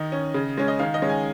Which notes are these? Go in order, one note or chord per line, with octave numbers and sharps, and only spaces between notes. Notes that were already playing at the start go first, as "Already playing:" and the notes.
Already playing: D#3 D#5
C#4
C#3
G#3 C#4
D#5
D#3 F5
D#5
G#3 C#4
G#5